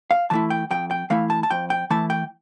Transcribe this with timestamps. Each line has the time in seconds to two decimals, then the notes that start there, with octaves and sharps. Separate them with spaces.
0.11 F5
0.30 E3 A3 E4 A5
0.50 G5
0.71 F2 G5
0.91 G5
1.10 E3 A3 E4 F5
1.30 A5
1.43 A5
1.50 F2 G5
1.70 G5
1.90 E3 A3 E4 A5
2.10 G5